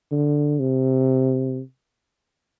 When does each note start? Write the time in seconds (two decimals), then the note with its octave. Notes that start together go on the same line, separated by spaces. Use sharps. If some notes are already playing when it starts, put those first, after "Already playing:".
0.12 D3
0.60 C3